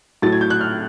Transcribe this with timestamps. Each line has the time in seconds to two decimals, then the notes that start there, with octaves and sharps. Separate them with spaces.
0.22 A2 F#3 A3 A6
0.33 G#6
0.41 G6
0.50 F#6
0.61 F6